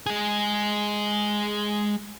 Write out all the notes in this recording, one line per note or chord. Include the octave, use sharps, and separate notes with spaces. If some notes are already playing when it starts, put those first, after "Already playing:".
G#3 G#4